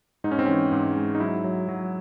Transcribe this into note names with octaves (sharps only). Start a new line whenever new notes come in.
G#2 D#4
C#4
C4
E3 C#4
G#2
G#3
D#4
F#3 E4
F#3
F#3